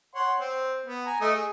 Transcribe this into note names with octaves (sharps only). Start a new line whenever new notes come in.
C#5 F#5 C6
C4
B3
G#5 A#5
A3 D#5 D#6
G#4